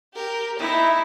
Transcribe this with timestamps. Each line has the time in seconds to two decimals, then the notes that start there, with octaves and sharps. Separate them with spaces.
0.15 G4 A#4
0.59 D#4 E4 E5